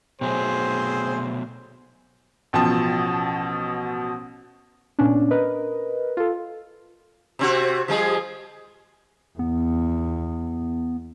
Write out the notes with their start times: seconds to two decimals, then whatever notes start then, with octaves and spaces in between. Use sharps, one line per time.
0.21 B2 F#3 A3 C4 G#4 C5
2.53 A1 B2 F3 A5
4.99 A#2 B3 C#4 D4
5.31 A#4 B4 D#5
6.17 F4 A4
7.39 C3 C4 F#4
7.88 F3 G3 G#4
9.39 E2 B3